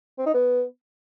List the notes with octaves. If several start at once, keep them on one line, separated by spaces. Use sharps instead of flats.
C4
D#4
B3